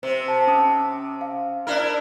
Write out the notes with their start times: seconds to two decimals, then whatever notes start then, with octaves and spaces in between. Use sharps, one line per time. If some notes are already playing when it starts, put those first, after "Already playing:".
0.03 C3 C5
0.28 A5
0.47 C#4 D#6
1.21 F5
1.67 D4 E4 A#4 F6